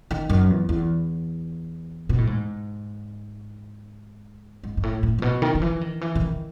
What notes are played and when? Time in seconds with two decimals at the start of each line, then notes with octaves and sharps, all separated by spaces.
0.11 D#3
0.29 F#2
0.50 E2
0.69 E2
2.09 B2
2.18 A2
2.27 G#2
4.63 G#2
4.77 G#2
4.83 A2
5.03 A2
5.19 A2
5.22 B2
5.42 D#3
5.55 D#3
5.62 E3
5.81 D#3
6.01 E3
6.15 C#3
6.21 D#3